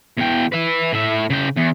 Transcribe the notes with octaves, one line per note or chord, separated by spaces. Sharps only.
E2 G5
B4 E5
A2 E5
C#3 G5
E2